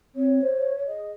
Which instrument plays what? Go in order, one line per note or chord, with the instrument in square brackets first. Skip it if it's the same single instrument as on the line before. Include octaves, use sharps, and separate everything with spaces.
[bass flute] C4 [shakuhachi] C#5
[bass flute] C5
[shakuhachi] G#4 [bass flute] D#5